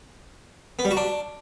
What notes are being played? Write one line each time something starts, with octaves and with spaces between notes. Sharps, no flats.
B3
G3
F#4
D4